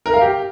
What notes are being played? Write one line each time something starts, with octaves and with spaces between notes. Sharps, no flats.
A#4
F5
G4